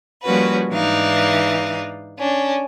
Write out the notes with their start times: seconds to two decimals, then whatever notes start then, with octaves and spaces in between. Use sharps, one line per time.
0.23 F3 G3 A#3 C#4 F#4 B4
0.70 G#2 E3 D4 D#4 F5
2.19 C#4 D4